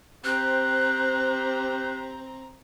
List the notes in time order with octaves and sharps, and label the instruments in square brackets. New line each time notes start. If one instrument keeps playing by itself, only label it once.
[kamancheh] C4 A#5 [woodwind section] G4 C5 [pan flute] F#6